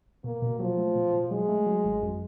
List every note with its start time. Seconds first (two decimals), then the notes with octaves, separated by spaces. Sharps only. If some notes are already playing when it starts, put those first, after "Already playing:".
0.24 B2 A#3
0.42 B2
0.59 F3 F#3
0.78 A3
0.95 B2
1.13 B2
1.30 F#3 G#3
1.49 A3
1.67 F#3
1.84 G#1
2.02 F#2